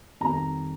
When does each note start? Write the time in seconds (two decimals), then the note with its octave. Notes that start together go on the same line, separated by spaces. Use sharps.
0.21 F2 D#3 G3 A#5